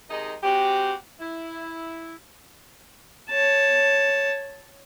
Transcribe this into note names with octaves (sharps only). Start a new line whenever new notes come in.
C3 D#3 G#3 D#4 G#4 D#5
G#3 C4 F#4 G4
E4
C#5 A5